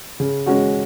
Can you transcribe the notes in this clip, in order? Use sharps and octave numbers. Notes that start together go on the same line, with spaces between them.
C#3
G#3 C#4 F#4